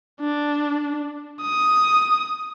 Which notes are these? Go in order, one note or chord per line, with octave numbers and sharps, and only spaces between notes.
D4
D#6